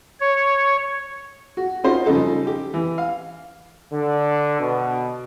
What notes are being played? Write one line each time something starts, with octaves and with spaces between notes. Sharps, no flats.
C#5
F#4
C#4 D#4 F4 F#4 C5
C#3 F3 G3 D#4 A4
G4
E3
F5
D3
B2